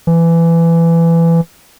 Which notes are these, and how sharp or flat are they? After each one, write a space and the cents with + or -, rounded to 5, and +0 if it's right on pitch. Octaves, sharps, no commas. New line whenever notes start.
E3 +20